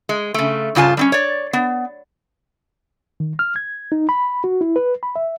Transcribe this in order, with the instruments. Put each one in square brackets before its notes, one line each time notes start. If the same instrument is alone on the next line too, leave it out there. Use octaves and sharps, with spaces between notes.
[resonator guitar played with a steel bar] G#3
C#3 A3
G2 C#3 F4 G#5 A5
G3 C4 C#4
C#5 D5
B3
[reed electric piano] D#3
F6
G#6
D#4
B5
F#4
E4
B4
B5
E5